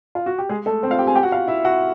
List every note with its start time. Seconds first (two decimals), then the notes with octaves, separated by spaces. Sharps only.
0.15 F4
0.26 F#4
0.38 G4
0.49 G#3 G#4
0.66 A3 A4
0.83 C4 C5
0.91 F4 F5
0.99 G4 G5
1.07 G#4 G#5
1.15 G4 G5
1.23 F#4 F#5
1.32 F4 F5
1.47 E4 E5
1.65 F#4 F#5